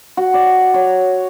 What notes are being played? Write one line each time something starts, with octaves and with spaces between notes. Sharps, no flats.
F#4
D5
C#5